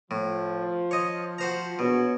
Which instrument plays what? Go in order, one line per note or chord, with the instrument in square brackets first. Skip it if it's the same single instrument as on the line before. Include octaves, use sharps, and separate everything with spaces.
[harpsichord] A2 [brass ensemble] F3
[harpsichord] C#5 D#5
F#4 C5 A#5
[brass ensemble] A#1 F#4 C#5 [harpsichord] B2